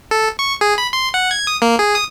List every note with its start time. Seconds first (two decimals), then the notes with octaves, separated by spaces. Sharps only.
0.11 A4
0.39 C#6
0.61 G#4
0.78 B5
0.93 C6
1.14 F#5
1.31 G#6
1.47 D#6
1.62 A#3
1.79 G#4
1.95 D#6